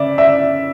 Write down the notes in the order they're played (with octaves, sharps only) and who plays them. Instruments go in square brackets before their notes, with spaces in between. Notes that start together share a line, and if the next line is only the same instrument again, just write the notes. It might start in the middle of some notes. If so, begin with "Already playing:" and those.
Already playing: [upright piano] C#3 D5 E5
D5 E5